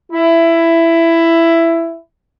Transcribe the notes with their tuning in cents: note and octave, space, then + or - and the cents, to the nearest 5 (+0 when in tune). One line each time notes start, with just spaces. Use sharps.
E4 +10